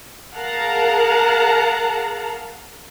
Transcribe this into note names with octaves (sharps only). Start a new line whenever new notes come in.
G#4 A#4 F5 F#5 A5 A#5